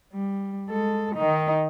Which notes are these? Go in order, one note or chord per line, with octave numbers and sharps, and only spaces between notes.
G3
G#3 A4
D#3 D#4